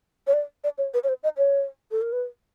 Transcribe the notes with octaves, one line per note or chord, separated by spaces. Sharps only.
C#5
D5
D5
C#5
B4
C#5
C5
D#5
C#5
A4
A#4
B4